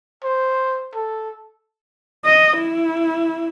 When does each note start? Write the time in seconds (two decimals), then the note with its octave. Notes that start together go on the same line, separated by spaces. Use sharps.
0.24 C5
0.95 A4
2.25 D#5
2.57 E4